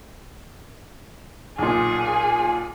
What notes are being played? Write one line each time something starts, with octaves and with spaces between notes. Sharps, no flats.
B1 A#2 G#4